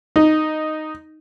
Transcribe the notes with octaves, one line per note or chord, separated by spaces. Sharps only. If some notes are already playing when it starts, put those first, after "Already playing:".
D#4